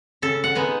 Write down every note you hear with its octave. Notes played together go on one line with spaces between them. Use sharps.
C#3 A4
F#5
G#3 B3 D#4